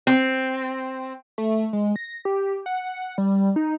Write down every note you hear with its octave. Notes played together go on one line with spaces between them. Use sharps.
C4
A3
G#3
A#6
G4
F#5
G3
D#4